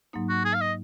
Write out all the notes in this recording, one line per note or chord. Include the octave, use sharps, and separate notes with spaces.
G#2 F#3 A#3 D#4
F#4
G#4
F5
D#5